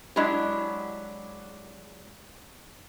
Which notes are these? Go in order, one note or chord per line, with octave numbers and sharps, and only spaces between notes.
F#3 G#3 D4 E4 G4